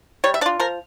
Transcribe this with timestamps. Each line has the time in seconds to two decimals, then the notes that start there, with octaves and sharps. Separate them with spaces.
0.24 G3 C#5
0.34 E5
0.41 D4 D5
0.46 F4
0.60 F3 A#4